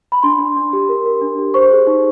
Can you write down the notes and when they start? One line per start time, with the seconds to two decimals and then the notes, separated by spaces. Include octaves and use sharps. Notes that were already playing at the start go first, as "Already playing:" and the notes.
0.12 B5
0.23 D4 C6
0.39 D4
0.57 D4
0.73 G4
0.89 A#4
1.06 A#4
1.21 D4
1.38 G4
1.54 C5 C#6
1.71 G#4
1.87 D#4